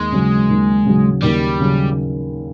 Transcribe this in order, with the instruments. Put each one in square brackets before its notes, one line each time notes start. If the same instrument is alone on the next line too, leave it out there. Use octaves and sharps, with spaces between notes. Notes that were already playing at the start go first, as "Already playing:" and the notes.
Already playing: [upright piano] D#2 [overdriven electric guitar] G#3
[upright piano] C#3 F#3
D#2
C#3 F#3
[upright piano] D#2 [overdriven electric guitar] G3
[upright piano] C#3 F#3